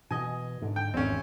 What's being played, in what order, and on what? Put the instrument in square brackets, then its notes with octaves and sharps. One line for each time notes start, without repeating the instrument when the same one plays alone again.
[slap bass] B2 E3 [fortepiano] D#5 G#5
[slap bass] G#2 D3
[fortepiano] G5
[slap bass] G#1 E2 [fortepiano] C4 C#4